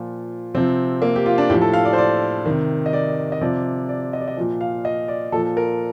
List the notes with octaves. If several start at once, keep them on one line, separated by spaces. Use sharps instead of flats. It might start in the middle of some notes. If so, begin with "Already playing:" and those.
Already playing: A#2 F3
C3 F3 C4
A#3
G4
F4
D4
A2 F3 G4
A4
F5
D5
C5
D5
C3 D#3
D#5
D5
D#5
C3 F3 D5
D5
D#5
D5
D#5
A#2 F3
F5
D#5
D5
A#2 F3 A4
A#4